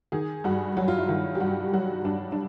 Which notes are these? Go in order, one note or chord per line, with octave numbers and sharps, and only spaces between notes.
D#3 G#4
G2 F#4
F#3 F#4
F4
E4
D#3 F4
G4
G2 F#4
F#3 F#4
G2 D4
D4